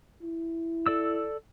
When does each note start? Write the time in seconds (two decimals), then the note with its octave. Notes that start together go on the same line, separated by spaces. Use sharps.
0.23 E4
0.86 A4 D5 E6